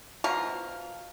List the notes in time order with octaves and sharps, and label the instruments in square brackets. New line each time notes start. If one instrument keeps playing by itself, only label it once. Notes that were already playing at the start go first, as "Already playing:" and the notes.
[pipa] B2 F3 A#4 C#6